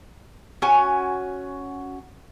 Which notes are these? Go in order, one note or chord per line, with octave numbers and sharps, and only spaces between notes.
C#4 F#4 G#5